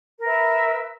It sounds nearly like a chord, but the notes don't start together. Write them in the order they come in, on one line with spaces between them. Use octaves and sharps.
A#4 B4 E5